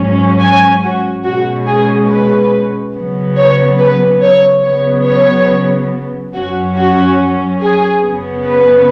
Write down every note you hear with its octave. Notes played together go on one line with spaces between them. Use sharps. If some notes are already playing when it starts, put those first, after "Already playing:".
Already playing: G#2 F#3 C#4
G#5
F#4
B2 G#3 C#4 F#4
G#4
B4
C#3 F#3 B3
C#5
B4
C#5
C#3 F#3 B3 C#5
C#5
F#2 F#3 C#4 F#4
F#4
G#4
F#2 C#3 B3
B4